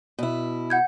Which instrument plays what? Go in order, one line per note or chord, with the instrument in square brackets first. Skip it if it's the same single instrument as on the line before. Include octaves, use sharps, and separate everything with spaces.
[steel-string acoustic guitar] B2 E4
[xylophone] F#5 G6 G#6